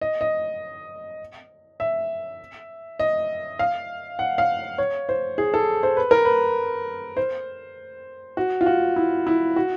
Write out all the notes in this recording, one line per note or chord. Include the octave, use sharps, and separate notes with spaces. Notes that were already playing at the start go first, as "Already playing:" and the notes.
D#5
D#5
E5
D#5
F5
F#5
F5
C#5
C5
G#4
A4
C5
B4
A#4
B4
C5
F#4
F4
F#4
E4
E4
F#4